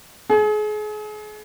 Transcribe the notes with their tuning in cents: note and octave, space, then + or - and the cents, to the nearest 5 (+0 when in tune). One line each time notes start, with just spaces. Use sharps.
G#4 +35